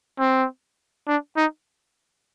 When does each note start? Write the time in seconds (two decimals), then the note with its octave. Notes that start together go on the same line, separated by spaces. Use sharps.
0.20 C4
1.08 D4
1.37 D#4